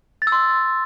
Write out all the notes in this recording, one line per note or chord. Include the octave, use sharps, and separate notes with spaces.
A6
E6
C6